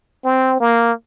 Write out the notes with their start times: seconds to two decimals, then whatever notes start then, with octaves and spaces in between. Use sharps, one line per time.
0.24 C4
0.60 A#3